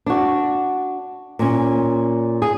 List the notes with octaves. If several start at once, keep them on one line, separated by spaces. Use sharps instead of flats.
D4 F#4
A#2 C#4
G#4